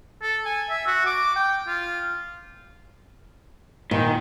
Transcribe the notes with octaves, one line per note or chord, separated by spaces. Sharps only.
A4
G#5
E5
F#4
D6
G5
F4
A#2 D#3